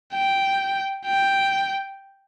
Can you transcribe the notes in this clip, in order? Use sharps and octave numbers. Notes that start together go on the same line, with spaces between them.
G5
G5